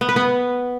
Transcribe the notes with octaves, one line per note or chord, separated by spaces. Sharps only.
B3
B4
B3